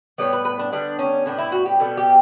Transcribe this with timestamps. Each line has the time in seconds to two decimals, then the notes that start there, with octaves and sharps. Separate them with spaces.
0.18 A2 G3 B3 C#5
0.33 B4
0.45 B4
0.59 D4
0.72 D3 G3 B3 D4
0.99 C#4
1.26 A2 G3 B3 D4
1.38 E4
1.52 F#4
1.66 G4
1.79 B2 G3 B3 A4
1.97 G4